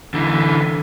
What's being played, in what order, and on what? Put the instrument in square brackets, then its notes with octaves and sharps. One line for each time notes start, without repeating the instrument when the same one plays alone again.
[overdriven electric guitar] D3 E3